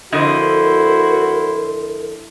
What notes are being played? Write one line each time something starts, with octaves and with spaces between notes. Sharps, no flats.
F2 D3 E4 F#4 A#4 C5 D#5